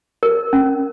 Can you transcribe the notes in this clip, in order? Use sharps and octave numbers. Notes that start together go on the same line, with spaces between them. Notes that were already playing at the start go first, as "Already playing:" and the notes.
A#4
C#4